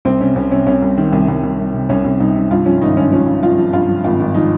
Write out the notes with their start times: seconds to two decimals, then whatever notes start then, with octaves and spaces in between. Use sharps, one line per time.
0.05 C2 C4
0.20 C3 C#4
0.36 C2 C#4
0.51 C3 C#4
0.67 C2 C#4
0.82 C2
0.97 D#3
1.12 C2
1.28 C2
1.43 C2
1.59 C3
1.74 C3
1.89 C2 C#4
2.05 C2
2.20 C2 D#4
2.35 C3
2.51 G2 F4
2.66 F3 C#4
2.82 G#1 D#4
2.97 G2 C#4
3.12 F3 C#4
3.27 G2
3.43 F3 F4
3.58 F3
3.73 G2 F4
3.89 F3
4.04 G#1 F4
4.20 G#1
4.34 F3 D#4